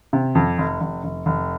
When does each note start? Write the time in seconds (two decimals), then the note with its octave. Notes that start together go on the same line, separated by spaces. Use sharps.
0.13 C3
0.35 F2
0.58 F1
0.81 F1
1.04 F1
1.26 F1